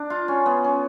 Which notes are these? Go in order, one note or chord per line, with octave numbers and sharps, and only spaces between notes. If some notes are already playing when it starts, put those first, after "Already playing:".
Already playing: D4
F4
C#4
B3
C#4